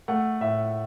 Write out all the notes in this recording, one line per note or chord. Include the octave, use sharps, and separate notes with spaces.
A3 F#5
A2 E5